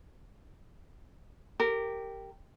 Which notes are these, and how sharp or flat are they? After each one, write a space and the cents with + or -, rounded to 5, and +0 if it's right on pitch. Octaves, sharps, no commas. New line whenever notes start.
G4 +0 A#4 -20